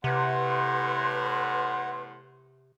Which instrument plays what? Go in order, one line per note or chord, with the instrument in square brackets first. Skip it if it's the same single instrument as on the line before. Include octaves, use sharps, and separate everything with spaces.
[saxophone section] E2 A2 [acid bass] C3 [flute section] B4 C6 [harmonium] F#5